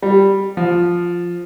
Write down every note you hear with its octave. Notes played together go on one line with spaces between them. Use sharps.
G3
F3